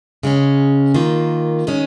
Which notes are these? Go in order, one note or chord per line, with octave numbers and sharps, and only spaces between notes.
C#3 G#3 C#4
D#3 A#3 F4
D#3 G#3 C#4